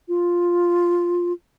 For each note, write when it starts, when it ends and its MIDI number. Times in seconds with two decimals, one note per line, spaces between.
0.08 1.33 65